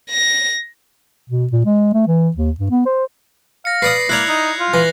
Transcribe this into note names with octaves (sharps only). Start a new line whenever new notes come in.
A#6
B2
A#2
G#3
A3
E3
D#2
G2
B3
C5
F5 A#6 C#7
B4 D5 D#6 C7
A#3 E4 D5 F#6 G#6 F7
D#4
F4
E3 A#6